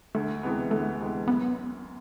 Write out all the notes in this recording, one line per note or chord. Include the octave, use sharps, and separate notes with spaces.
D2 A3
C3 E3 G#3 B3
D2 A3
C3 E3 G#3 B3
F#2 B3